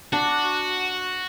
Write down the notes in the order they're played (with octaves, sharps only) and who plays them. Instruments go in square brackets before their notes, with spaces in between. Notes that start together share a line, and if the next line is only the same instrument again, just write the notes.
[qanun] D4 [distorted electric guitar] F#4